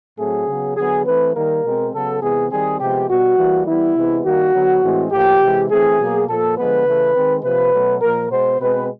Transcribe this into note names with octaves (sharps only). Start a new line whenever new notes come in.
A2 F#3 A3 C4 G#4
C#3 F#3 B3
D3 F#3 B3 G#4
E3 A3 C4 B4
D#3 G3 A#3 A#4
B2 G#3 C4
C#3 F#3 B3 A4
C3 E3 G#3 B3 G#4
D#3 G3 C4 G#4
C3 F3 G#3 B3 G4
B2 G3 B3 F#4
E3 G3 A#3
E3 G3 B3 E4
C3 E3 G#3 B3
D#3 G3 A#3 F#4
D3 F#3 B3
A2 E3 G#3 C4
A2 F3 A#3 G4
C3 E3 G#3
E3 A3 C4 G#4
B2 F#3 A#3
A#2 F3 A#3 A4
D3 F3 G#3 B3 B4
C#3 E3 A3
D#3 G#3 C4
C3 F3 A#3 B4
B2 F#3 A3
A#2 F3 A#3 A#4
B2 G#3 B3 C5
B2 G#3 C4 B4